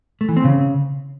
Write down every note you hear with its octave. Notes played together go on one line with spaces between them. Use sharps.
A3
E3
C4
C#3